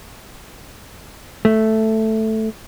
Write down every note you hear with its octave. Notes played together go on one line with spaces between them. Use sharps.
A3